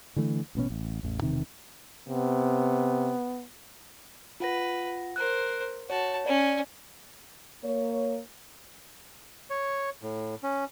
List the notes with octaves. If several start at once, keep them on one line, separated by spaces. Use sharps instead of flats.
D3 E3 A3
A1 B2 B3 C#4
A1
A1 E2
E1 C3 D#3
C3 B3
F4 B4 F#5 A#6
A#4 C5 F#6
F#4 C#5 A5
C#4 D5
A#3 C#5
C#5
A2
C#4